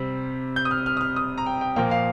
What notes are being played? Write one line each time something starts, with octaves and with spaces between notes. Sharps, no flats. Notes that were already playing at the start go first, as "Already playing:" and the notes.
Already playing: C3 G3 C4
G6
D#6
F6
F6
D#6
F6
D#6
A#5
G5
G5
A#2 F3 A#3 G5
F5